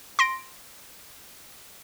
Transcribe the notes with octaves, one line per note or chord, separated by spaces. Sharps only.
C6 A#6 D7